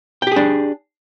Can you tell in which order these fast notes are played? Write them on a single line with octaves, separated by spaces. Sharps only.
G5 G4 G#4 D4